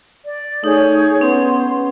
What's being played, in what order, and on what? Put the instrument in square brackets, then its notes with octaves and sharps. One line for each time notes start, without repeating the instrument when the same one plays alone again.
[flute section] D5
[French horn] A3 [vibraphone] D#4 [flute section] G#4 C#5 G6
[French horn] B3 [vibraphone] C#4 [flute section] C6